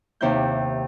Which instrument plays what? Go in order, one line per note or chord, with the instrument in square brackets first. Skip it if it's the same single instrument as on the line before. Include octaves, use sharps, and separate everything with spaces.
[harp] D#2 C3 E4 G6